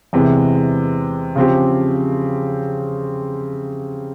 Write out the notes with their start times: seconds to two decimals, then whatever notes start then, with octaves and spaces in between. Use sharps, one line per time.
0.13 E2 C3 E3 G#3 E4
1.36 C#3 F3 C4 G4